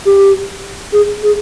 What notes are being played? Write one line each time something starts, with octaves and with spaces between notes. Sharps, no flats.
G4
G#4
G#4